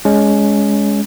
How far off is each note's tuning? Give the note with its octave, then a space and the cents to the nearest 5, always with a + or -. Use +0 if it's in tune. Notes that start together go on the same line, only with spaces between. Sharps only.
G#3 +0 C#4 +20